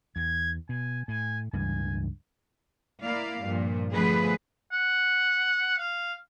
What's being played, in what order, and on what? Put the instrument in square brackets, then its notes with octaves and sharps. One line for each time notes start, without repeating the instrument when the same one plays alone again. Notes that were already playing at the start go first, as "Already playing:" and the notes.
[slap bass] E2 [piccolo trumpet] G#6
[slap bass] B2 [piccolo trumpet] G#5
[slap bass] A2 [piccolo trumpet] G#5
[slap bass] C#2 G2 E3 [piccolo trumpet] G#5
[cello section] A#3 E4 D5 F5
G2 A#2 F3
D3 F3 A3 B3 G#4 B4
[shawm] F#5
F5